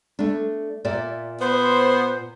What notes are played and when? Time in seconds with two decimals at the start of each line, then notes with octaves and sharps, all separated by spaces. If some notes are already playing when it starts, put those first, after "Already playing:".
0.19 A3 D4
0.85 A#2 D5 E5
1.40 B3 C5